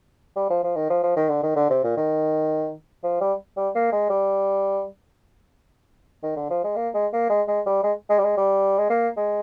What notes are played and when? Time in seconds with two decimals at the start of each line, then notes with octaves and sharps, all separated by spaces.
0.36 G3
0.50 F3
0.64 F3
0.76 D#3
0.90 F3
1.03 F3
1.16 D#3
1.29 D3
1.43 D#3
1.56 D3
1.70 C3
1.84 A#2
1.97 D#3
3.03 F3
3.20 G3
3.57 G3
3.75 A#3
3.92 G#3
4.09 G3
6.23 D#3
6.36 D3
6.50 F3
6.64 G#3
6.76 A#3
6.94 G#3
7.13 A#3
7.29 G#3
7.48 G#3
7.66 G3
7.83 G#3
8.09 G#3
8.19 G3
8.24 G#3
8.37 G3
8.78 G#3
8.90 A#3
9.17 G#3